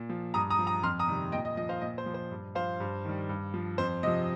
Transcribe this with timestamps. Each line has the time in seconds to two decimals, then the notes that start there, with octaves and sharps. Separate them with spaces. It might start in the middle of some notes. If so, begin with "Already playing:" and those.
Already playing: A#2
0.09 F3
0.34 G2 A#5 D#6
0.50 A#5 D#6
0.59 F3
0.67 A#5 D#6
0.83 F2 C6 F6
0.99 A#5 D#6
1.08 C3 D#3 G3
1.32 A#2 D#5 G5
1.45 D#5
1.57 F3 D#5
1.69 C5 F5
1.81 A#2 D#5
1.98 C5
2.06 F3
2.14 C5
2.31 G2
2.55 F3 C5 F5
2.80 G2
3.05 D#3 G3
3.29 G2
3.54 F3
3.78 F2 C5
4.03 C3 D#5
4.07 F3